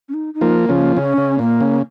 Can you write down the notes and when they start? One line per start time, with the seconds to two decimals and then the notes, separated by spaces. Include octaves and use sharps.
0.09 C#4
0.14 D#4
0.34 D#4
0.41 F3 A#3
0.69 C#3 F3
0.76 A#3
0.97 C#3 C#4
1.18 C#3
1.39 A#2 A#3
1.61 C#3